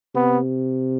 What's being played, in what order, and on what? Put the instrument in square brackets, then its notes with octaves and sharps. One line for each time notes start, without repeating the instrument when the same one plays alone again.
[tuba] C3 [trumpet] B3